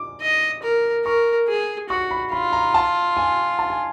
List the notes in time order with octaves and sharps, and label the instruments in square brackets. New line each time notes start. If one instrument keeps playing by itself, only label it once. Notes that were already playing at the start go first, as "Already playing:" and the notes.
Already playing: [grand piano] D6
[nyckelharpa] D#5
A#4
[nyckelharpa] A#4 [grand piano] C#6
[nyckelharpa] G#4
[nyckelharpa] F#4 [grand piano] C#6
[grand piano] B5
[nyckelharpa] F4 [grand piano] B5
[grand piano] A#5
A5
G#5
A5
G#5